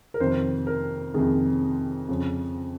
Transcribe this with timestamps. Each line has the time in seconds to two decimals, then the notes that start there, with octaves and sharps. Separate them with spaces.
0.14 A#4
0.20 F2 C3 D#3 C5
0.67 A#4
1.14 F2 C3 D#3 G#4
2.09 F2 C#3